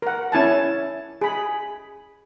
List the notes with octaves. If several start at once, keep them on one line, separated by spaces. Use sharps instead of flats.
A#4 F#5
C#4 E4 G#5 A5
G#4 B5